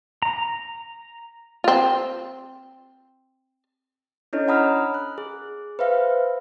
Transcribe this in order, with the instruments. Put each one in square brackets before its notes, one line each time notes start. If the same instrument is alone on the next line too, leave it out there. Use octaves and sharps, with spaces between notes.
[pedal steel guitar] A#5
[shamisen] C4 F4
[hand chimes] C#4 D4 E4 A4 C#5 D#5
F#5 G#5 A#5 B5 D#6 F6
F#6
G#4
B4 C5 E5 F5